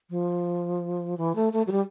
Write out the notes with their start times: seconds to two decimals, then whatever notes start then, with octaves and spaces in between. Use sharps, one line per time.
0.10 F3
1.18 E3
1.35 A3
1.53 A3
1.67 F#3
1.72 G3